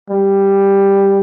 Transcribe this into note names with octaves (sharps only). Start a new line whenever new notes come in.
G3